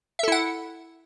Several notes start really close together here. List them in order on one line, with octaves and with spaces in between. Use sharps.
E5 A4 E4 F#5